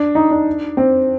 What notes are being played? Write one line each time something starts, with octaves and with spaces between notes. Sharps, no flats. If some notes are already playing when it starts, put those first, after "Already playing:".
Already playing: D4
D#4
D4
C4